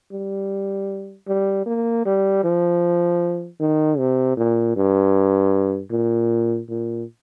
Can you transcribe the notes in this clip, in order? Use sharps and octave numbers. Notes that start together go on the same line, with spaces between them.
G3
G3
A#3
G3
F3
D#3
C3
A#2
G2
A#2
A#2